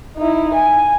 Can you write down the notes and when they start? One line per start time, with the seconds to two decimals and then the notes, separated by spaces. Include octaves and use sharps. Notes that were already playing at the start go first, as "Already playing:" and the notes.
0.17 D#4 E4
0.54 G#5